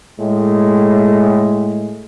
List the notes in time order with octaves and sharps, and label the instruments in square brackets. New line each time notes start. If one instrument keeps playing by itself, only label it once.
[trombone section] A2 G#3